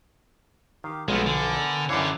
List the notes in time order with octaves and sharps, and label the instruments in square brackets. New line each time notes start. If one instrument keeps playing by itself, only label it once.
[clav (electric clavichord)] D#3 [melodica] G4 F5
[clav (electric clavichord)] B1 F3 [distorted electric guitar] G#3 A3 [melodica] B3 A#4 G#5
[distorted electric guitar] D3
[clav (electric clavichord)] F#2 D3 E3 [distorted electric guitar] G4 C#5 [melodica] D5 F5